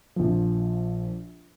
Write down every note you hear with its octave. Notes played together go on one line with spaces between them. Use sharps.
A#1 F3